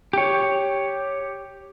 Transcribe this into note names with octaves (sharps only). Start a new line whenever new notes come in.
G4 C#5